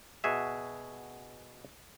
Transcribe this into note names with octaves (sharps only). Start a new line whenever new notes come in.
B2 F#4 G#4 E5